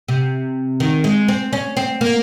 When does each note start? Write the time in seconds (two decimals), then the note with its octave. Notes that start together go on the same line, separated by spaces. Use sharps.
0.08 C3
0.80 D#3
1.04 G#3
1.28 C4
1.53 C#4
1.77 C4
2.01 A#3